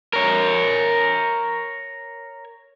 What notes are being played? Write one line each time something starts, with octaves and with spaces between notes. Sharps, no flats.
A#4 C#5